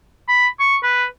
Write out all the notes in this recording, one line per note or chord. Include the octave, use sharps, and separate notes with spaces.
B5
C#6
B4